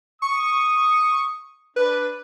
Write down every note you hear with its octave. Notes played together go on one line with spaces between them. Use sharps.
C#6 D#6
D4 B4